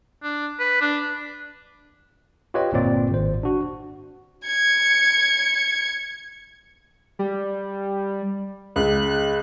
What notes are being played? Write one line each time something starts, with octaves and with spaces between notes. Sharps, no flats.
D4
B4
D4
F4 G4 B4 C#5 D#5 G5
G1 A#2 C4 D5
G#1 C5
D4 F#4
G#6 C#7
G3
C#2 F#6